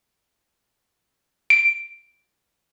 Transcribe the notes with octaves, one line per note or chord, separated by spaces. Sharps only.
D7